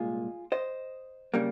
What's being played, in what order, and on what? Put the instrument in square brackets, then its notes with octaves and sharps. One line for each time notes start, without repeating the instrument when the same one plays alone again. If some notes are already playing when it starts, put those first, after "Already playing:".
Already playing: [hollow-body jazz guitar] C2 A#2 G#3 F4 G#4
C5 D#5
C#3 G3 A#3